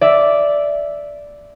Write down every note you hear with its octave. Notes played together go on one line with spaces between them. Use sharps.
D5 E5